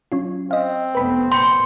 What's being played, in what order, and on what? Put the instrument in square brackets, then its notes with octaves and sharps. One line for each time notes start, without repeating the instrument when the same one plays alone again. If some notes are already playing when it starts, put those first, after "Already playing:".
[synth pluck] F#3 C#4 F4
[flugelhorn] C4 [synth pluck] D#5 F5
[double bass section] F1 A3 B3 [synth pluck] B4 B5
[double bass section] A#2 [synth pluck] B5 G6 C#7 [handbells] C6